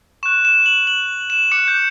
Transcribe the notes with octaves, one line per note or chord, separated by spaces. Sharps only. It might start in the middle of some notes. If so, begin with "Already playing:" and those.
C#6 F#6 E7
E7
F#7
F#7
E7
D6 F#6 C#7
G6